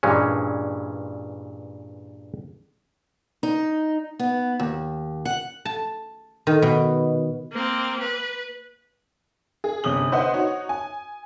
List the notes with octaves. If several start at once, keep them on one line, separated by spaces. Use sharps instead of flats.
G2 A#2 E3 G#3 C#4
D#4
B3
D#2
F#5
A5
D#3
B2
A#3 C4
B4
G#4
G1 C3 C#4 D#6 F#7
B4 C5 D#5 E5 F#5 C6
D#4 F#4 C#5
G#5